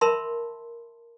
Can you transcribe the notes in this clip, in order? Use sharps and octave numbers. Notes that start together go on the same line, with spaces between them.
A#4 E5 A5 B5 C6